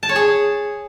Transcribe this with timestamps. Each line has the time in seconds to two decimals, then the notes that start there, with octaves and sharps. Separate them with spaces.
0.03 A5
0.09 C#5
0.16 G#4